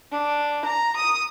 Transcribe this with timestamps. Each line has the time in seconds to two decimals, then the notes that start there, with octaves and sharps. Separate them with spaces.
0.12 D4
0.65 A#5
0.96 D#6